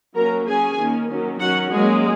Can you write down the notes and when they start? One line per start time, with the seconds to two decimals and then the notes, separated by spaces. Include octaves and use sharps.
0.15 F#3 A#3 C#4 A#4 A#5
0.46 F#3 C#4 G#4 G#5
0.78 D#3 A#3 C#4
1.09 D#3 F#3 A#3 C#4
1.40 D#3 F#3 C#4 F#4 F#5
1.71 F#3 G#3 A#3 C#4 G#4